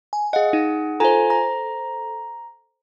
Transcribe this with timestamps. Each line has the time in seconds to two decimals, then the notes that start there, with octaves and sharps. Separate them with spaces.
0.13 G#5
0.33 G#4 D#5 F5 F#5
0.53 D#4
1.00 F4 A4 C5 G#5 A#5
1.30 A#5